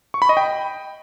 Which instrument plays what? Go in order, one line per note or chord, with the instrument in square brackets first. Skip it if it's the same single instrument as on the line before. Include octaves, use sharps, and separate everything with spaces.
[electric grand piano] C#6
B5
D#5
G5